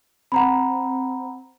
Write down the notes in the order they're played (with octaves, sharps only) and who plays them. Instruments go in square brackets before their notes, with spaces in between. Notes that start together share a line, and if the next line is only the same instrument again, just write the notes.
[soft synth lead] C4 [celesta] F#5 A#5 B5